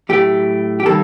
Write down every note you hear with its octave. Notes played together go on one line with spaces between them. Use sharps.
A2 F#3 A3 G4
G4
D#3 G3 A#3 A4